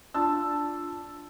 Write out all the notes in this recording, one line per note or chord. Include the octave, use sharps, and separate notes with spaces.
D4 F4 A5 E6